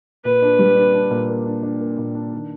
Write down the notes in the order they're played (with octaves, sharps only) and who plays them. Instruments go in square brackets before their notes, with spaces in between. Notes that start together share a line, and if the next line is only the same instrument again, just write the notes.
[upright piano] A#2 [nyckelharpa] B4
[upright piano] D4
G3
D4
D4
A#2
A#3
D4
D4
A#3
A#2
D4
D#3